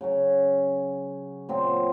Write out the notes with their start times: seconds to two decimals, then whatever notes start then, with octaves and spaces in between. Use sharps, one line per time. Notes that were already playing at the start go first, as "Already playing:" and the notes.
0.01 C#3 F#3 C#4
1.49 A#2 F#3 C4 F4